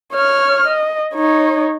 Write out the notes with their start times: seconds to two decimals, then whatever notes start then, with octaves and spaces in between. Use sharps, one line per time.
0.13 C#5 F6
0.67 D#5
1.15 D#4 C#5